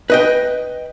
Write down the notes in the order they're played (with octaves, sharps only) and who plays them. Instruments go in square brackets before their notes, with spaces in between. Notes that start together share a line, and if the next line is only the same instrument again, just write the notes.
[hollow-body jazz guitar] B4 D#5 G5